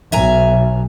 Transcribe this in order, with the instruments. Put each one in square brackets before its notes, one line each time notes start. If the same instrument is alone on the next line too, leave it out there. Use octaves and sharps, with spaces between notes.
[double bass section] B1 [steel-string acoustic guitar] E5 G#5 A#5